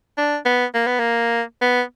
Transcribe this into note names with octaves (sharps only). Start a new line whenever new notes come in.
D4
B3
A#3
B3
A#3
B3